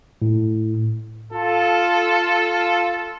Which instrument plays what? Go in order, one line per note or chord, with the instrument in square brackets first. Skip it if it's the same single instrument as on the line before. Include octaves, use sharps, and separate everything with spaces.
[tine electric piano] A2
[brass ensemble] F4 A4